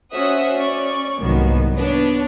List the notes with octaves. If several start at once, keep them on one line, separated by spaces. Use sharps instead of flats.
C#4 F#4 C5 E5 F#5 D#6
C#4 D5 C#6
C2 G#2 D#3 F#3 A#3 B3
B3 D4 C#5